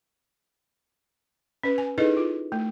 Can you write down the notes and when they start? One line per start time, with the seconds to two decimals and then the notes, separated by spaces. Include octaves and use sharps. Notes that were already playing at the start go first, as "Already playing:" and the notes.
1.63 C#4 B4
1.78 G#5
1.98 D#4 E4 G#4 A4 B4 D#5
2.17 F4
2.52 A3